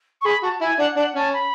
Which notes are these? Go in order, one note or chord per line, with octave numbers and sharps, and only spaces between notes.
C#6
G#4 B5
F#4 A5
E4 G#5
D4 F#5
D4 F#5
C#4 A5
B5